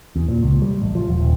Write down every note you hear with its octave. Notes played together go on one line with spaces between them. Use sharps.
E2
A#2
C#2
G3
A1
F3
E1
D#1